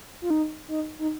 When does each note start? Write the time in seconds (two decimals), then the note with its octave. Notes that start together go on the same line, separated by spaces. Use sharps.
0.22 F4
0.30 D#4
0.68 D#4
0.99 D#4